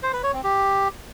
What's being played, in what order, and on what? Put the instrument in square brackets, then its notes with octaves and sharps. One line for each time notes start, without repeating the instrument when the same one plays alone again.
[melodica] C5
B4
C#5
C4
G4